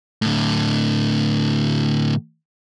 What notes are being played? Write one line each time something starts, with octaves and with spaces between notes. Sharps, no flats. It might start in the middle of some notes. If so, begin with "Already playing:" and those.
A2 D3